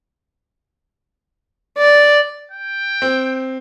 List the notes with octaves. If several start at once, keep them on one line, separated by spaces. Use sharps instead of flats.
D5
G5
C4